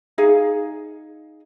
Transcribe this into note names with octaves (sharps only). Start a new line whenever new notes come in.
D#4 G#4 F5